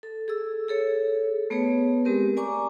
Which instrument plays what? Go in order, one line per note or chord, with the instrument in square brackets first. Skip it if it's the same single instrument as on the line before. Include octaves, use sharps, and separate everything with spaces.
[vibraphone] A4
G#4 A4 E6
G#4 A4 C#5
A3 B3 G#4 B4 C#5
G#3 C4 G4 A#4
D5 G#5 A#5 C#6 D6